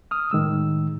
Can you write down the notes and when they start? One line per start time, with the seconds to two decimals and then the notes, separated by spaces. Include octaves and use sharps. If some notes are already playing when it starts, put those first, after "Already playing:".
0.11 D#6 F6
0.31 A2 D#3 G#3 E6